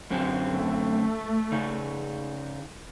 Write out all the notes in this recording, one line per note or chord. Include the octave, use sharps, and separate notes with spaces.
F#2 D3 C4
A3
C#3 D#4